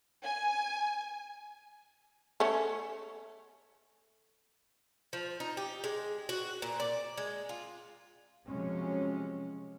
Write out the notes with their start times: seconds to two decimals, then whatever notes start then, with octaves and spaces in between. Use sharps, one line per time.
0.24 G#5
2.40 A3 C#4
5.13 F3
5.40 D#4
5.57 G4
5.84 G#3
6.29 F#4
6.62 A#2
6.80 D5
7.18 G#3
7.49 F4
8.47 C3 F3 F#3 G#3 C#4